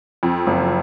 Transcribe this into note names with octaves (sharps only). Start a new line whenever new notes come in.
F2
F#1